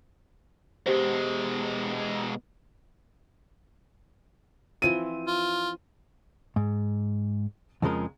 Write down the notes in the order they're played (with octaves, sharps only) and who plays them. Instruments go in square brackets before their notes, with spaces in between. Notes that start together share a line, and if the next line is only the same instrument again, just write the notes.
[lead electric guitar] B2 G#3 [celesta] G4 C5
[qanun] E3 F3 C4 [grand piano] D#7
[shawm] F4
[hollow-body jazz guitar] G#2
F2 C#3 F3 G#3 A#4